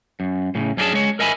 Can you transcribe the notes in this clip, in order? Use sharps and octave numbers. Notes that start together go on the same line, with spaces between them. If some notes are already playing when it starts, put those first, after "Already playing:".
F#2
A2 C#3
F#2 C#4 D4 G4 G#4 A5
G#3 C#5
A#4 D#5 E5 G#5 A#5 B5